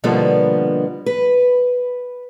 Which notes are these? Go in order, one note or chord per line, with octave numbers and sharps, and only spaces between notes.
B2 D3 F3 G3 A#3 B3
B4